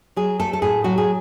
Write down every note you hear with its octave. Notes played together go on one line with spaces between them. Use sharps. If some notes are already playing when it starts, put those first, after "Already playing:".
F#3 G#4
A3 A4
A4
A2 G#4
F#3 F#4
G#4